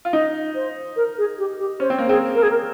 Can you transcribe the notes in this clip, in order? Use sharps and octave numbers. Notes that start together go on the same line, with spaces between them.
F4
D#4 D#5
C5
A#4
G#4
G4
G4
C#4 C5
C4
A#3
C4 G#4
A#4
G#4
A#4